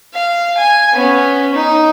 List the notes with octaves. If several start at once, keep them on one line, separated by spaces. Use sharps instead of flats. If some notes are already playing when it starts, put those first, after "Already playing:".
F5
G#5
B3 C#4
D#4